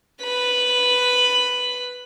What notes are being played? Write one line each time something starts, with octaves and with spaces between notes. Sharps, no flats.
B4 B5